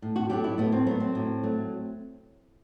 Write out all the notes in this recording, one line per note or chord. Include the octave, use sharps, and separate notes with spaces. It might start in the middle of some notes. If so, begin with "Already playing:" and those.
A2
F#4
F#3 A3 G4
E4
A2 B3
C4
F#3 A3 B3
C4
A2
F#3 A3